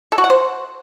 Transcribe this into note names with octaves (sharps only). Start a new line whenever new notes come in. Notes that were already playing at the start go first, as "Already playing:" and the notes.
A4
F#4
F#5
C5